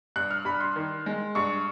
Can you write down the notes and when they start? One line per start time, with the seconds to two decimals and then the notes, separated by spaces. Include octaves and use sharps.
0.16 G2 F#6
0.31 F6
0.45 G2 B5
0.61 C6
0.76 D#3
1.06 G#3
1.35 G2 C#6